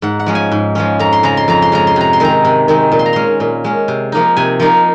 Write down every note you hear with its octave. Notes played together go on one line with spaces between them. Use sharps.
G#2 F#5
F#5
F3 G#3 C#4
G#5
G#2
F3 G#3 C#4
F2 A#5
C6
C#3 G#3 A#5
C6
F2 A#5
C6
C#3 G#3 A#5
C6
C3 A#5
C6
D#3 G#3 C4 A#5
C3
D#3 G#3 C4
A#2
C6
A#5
G#3 C#4 C6
A#2
G#3 C#4
C3
F3 A#3 D#4
C3 G#5
F3 A#3 D#4